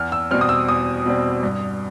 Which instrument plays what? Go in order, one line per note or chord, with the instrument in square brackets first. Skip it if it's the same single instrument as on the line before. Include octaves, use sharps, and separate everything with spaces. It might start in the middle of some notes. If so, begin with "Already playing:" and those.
Already playing: [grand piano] E2 F6
E6
B2 G3 C4 F6
D#6
E6
E2 D#6
B2 G3 C4
G2